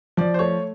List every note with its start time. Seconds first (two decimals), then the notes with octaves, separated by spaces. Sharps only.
0.17 F3 D5
0.34 C5
0.39 A3 C#5